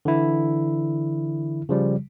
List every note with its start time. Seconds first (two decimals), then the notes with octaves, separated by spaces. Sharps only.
0.05 D3 E3 E4
1.69 C#3 F3 G3